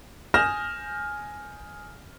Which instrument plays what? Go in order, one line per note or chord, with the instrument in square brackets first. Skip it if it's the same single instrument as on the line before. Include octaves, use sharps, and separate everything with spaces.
[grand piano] G#5 D#6 F6 G6 A#6 E7